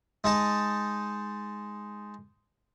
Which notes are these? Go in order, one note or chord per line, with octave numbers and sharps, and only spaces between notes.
G#3 D#4 A5